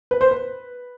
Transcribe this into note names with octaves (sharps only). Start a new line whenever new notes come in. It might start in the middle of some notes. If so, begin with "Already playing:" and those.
B4
C5
B4